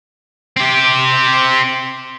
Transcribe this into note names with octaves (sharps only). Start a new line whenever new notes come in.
C4 G4